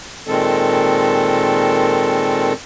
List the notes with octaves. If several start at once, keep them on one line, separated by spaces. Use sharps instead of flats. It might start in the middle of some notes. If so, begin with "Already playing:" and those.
A#2 D#3 G#3 C4 A4